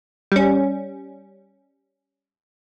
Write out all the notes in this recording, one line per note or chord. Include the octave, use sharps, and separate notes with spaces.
G3 C#4